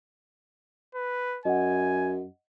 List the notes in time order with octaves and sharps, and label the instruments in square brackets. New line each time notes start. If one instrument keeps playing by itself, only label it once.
[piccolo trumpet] B4
[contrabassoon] F#2 [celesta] D#5 F#5 [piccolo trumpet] G#5